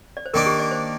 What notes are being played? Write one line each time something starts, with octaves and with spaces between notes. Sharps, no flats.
D5
C5
D#3 A#3 D4 A#4
G4
D5
C5